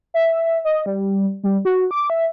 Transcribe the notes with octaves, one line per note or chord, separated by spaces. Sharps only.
E5
D#5
G3
G3
F#4
D6
E5